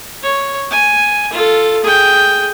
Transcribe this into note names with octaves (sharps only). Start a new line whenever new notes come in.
C#5
G#5
F4 A4
G#4 G5